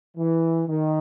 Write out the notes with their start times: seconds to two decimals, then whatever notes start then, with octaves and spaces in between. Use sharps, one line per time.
0.17 E3
0.69 D#3